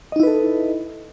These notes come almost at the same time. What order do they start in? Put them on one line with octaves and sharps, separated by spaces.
D#5 D#4 E4 B4 A4